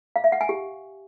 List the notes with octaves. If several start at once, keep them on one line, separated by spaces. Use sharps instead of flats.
F5
E5
F#5
G#5
G4